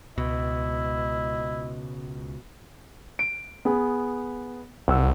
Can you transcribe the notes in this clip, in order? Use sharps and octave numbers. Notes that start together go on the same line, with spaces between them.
C#2 B2 E4 D#5
D7
B3 G#4
C2 F#5 E6